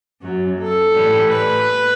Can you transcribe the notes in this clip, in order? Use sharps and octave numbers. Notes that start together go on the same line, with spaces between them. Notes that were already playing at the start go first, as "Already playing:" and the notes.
F#2 F#3
A4
A2 E3 G3
B4